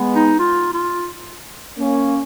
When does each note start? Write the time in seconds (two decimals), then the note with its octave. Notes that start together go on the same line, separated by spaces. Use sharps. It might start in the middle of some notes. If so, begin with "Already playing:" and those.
Already playing: G#3 B3
0.16 D#4
0.39 F4
0.73 F4
1.78 A#3 C#4